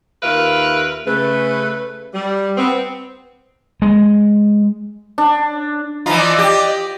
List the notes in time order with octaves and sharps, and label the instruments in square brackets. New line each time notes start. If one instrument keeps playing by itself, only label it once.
[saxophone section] D#2 F4 A#4 B4 E5 F5
C#3 A3 B4
G3
B3 C4
[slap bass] G#3
[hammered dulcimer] D4
[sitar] E3 F3 F4 [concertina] D#5 A#5 B5
[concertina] D5 D#5
[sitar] G4